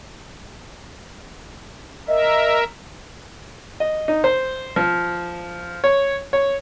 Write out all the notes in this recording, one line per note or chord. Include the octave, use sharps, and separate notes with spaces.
A#4 D#5 E5
D#5
D#4
C5
F3
C#5
C#5